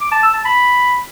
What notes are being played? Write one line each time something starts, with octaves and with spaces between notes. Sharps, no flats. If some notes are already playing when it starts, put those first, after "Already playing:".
D6
A5
E6
A5
B5